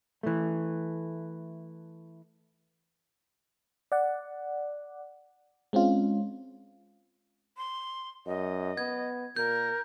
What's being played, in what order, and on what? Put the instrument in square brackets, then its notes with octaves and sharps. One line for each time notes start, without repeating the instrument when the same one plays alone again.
[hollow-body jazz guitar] E3 A3
[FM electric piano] D5 F#5
G#3 C4 C#4 F4
[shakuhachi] C6
[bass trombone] F#2 [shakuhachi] D#5
[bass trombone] B3 [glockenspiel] G#6
[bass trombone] A#2 [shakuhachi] A#4 [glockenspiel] G6